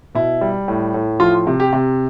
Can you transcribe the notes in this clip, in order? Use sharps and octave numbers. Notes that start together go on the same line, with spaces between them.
B2 E4
G3
A2
A2
F3 F4
C3
G4
C3